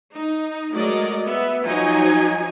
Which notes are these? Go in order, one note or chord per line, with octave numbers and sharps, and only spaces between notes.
D#4
F#3 G#3 A3 A#4 D5 D#5
B3 E5
F3 F#3 D#4 G#5